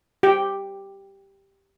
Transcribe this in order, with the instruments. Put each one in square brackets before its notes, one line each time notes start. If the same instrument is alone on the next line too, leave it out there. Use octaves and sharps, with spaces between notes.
[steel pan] G4 G5